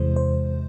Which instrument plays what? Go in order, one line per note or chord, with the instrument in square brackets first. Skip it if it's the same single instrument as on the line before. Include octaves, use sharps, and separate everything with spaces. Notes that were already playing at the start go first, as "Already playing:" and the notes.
Already playing: [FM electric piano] E2 C3 E3 G#3 C5
C5